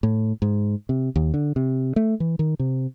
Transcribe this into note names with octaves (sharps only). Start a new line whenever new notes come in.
A2
G#2
C3
D#2
D3
C3
A3
E3
D#3
C3